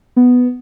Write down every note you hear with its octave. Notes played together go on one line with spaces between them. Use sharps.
B3